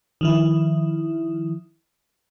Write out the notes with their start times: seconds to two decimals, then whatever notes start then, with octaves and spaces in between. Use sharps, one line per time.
0.21 D#3 F3 E4